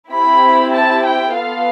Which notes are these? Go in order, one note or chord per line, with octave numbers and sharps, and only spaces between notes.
C4 E4 G4 B5
A5
G5
B3 F4 A4 F5